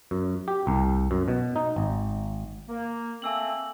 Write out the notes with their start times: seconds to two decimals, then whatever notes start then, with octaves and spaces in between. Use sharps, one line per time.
0.11 F#2
0.48 G4
0.67 C2
1.11 F#2
1.28 B2
1.56 D#4
1.76 G#1
2.69 A#3
3.22 A3 A#3 C4 G#5 E6 F#7